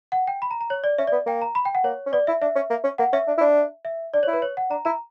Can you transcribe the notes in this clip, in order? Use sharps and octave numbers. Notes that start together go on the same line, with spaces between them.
F#5
G5
B5
A#5
A#5
C#5
D5
C#4 E5
D5
B3
A#3 G5
A#5
B5
G5
F#5
A#3 C#5
C#4
B3 D5
E4 E5
D4 E5
C#4
A#3
C#4
A#3 F#5
C#4 E5
D4
E4
D4
E5
D4 D5
C#5
E4
B4
C#5
F#5
D4 A#5
E4 A#5